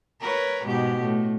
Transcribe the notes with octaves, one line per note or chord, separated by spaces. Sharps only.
A#4 B4 C#5
G#2 B2 G4
A2